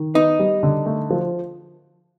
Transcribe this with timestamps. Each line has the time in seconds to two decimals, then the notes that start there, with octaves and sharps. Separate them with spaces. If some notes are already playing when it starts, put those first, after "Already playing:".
Already playing: D#3
0.14 B3 D#4
0.39 G3
0.63 D3
0.86 A3
1.10 F3